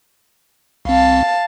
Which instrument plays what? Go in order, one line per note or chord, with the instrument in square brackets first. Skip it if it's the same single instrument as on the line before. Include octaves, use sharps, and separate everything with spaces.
[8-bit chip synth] C2 C4 [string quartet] F5 A5